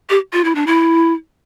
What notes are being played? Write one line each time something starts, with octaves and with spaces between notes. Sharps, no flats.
G4
F4
E4
D4
E4